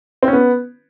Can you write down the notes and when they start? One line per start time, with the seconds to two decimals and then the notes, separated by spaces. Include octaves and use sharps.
0.23 C4
0.28 C#4
0.33 B3